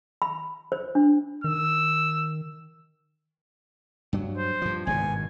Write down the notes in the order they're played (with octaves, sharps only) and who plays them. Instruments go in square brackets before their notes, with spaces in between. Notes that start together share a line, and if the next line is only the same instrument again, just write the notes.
[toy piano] B5
C5
D4
[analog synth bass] D#3 [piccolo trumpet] E6
[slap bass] G2 F#3
[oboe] C5
[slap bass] G2 F3
[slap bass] G#1 G2 B2 [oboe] G#5